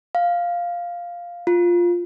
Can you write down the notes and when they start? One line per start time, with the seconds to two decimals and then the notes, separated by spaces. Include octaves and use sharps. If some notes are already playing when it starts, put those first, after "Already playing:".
0.15 F5
1.47 F4